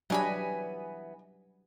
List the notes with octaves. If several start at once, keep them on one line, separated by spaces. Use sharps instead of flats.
E3 F#3 G3 B3 D4 D#5 G#5 B5